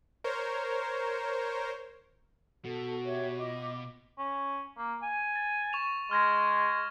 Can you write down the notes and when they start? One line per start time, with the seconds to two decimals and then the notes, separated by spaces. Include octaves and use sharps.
0.24 A#4 C5 C#5
2.65 B2 F#4 A4
3.05 G4 C#5 E5
3.38 F4 D#5 D6
4.18 C#4
4.78 A#3
5.02 G#5
5.36 A6
5.73 C#6 E7 F7
6.11 G#3 F6 G#6 A#6